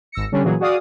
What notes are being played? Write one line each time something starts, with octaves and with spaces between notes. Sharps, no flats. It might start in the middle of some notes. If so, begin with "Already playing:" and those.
G#1 E6 A#6 C#7
D3 G3 C#4 D4
A#2 E3 F#3 G#4
F#4 G#4 D5 F5 D#6